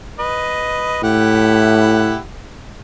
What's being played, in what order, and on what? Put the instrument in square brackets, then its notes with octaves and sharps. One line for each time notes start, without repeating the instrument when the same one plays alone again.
[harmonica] B4 D#5
[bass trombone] A2 [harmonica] E4 G4 F#5